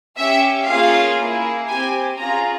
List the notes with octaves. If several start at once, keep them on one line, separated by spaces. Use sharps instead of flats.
C#4 G4 E5
A#3 C#4 F4 G#4 F5
A#3 E4 G#4
C4 G4 G#5
C#4 F4 G#4 A#5